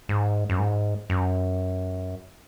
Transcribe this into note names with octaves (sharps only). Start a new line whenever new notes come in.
G#2
F#2
G#2
F#2